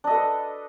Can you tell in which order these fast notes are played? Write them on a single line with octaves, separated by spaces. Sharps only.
D4 D#5 A4 B4